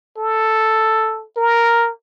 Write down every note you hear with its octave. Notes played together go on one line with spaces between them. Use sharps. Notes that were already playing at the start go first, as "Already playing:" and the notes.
A4
A#4